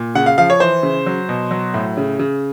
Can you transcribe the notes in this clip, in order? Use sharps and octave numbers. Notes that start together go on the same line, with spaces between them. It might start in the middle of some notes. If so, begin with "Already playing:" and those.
Already playing: A#2
C#3 F#5
F5
F3 F5
C#5
E3 C5
C#3
F#3
B2
F#3
A2
C#3
C#3